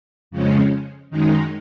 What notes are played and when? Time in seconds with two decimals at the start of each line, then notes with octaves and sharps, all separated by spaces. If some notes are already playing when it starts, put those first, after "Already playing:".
0.31 F2 C#3 F3 G#3 C#4
1.10 F#2 D#3 G#3 D#4